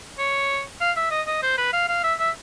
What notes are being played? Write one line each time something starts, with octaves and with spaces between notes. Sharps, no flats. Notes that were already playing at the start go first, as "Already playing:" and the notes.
C#5
F5
E5
D#5
D#5
C5
B4
F5
F5
E5
E5